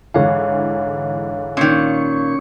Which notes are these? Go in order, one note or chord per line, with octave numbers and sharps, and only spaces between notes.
G#2 D3 E3 C#5 F5
A#2 D#3 C#4 C#6